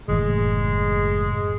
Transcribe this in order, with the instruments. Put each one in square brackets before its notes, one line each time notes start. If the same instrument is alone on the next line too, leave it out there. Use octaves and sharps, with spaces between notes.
[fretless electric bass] F#1 A2 E3 [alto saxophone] G#3